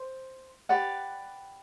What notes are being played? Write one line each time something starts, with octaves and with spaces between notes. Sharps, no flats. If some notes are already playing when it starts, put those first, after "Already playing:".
Already playing: C5
G4 B4 D5 F#5